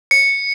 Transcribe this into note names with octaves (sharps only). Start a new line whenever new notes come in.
C#7